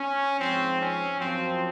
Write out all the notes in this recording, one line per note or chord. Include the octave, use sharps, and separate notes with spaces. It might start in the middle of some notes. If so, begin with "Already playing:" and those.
Already playing: C#4
G#2 F3 C4
C#4
F#2 F3 C4